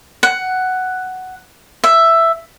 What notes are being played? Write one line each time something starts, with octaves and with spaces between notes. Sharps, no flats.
F#5
E5